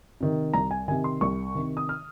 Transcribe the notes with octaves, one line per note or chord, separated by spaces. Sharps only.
C3 D#3
C2 A#5
G#5
C3 D#3 G#5
C6
C2 C#6
C3 D#3
D#6
F6